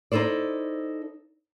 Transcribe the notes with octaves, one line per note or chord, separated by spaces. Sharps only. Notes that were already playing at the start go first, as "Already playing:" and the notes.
D#4 E4 A4 C5 D5